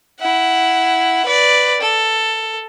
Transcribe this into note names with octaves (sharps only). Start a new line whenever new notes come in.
E4 F#5
B4 D5
A4